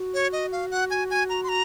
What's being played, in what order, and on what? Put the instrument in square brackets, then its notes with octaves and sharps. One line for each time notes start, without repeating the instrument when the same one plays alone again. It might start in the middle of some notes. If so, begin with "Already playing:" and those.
Already playing: [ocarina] F#4
[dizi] C#5
D#5
F5
F#5
G#5
G#5
A#5
C6
A#5